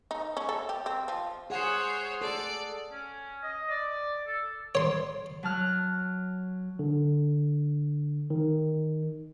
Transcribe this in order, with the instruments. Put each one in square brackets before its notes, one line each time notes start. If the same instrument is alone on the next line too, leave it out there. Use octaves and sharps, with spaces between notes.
[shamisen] D#4
C#4
A4
G4
C4
F3
[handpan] G#4 F#5 [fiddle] C5 C#5
[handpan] A4 [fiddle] D5
[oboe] C#4
D#5
D5
A4
[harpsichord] C#5 C6
[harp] F#3 A5 F6 F#6
[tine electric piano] D3
D#3